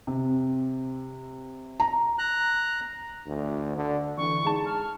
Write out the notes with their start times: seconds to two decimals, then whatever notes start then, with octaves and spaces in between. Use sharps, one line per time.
0.07 C3
1.80 A#5
2.18 A#5 F#6
3.26 D2
3.76 D3
4.17 D3 E3 C#6
4.45 G#3 D#4 A5
4.66 F6